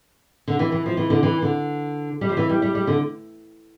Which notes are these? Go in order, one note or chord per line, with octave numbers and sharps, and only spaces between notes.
D3
E3
E3
F3
E3
D3
E3
D3
G3
F3
E3
G3
G3
G3
D3